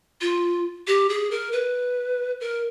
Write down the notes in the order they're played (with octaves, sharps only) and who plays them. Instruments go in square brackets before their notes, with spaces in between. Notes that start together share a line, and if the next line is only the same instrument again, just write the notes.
[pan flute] F4
G4
G#4
A#4
B4
A#4